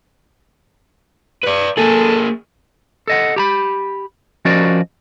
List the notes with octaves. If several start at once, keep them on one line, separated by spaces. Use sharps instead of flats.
B4 D5
A#3 G#4 A4
A4 D#5 F#5
G4 A#5 B5
F3 C#4 F#4 A#4 D5 D#5